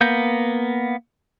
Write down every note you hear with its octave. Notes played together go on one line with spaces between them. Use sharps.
A#3 B3 G6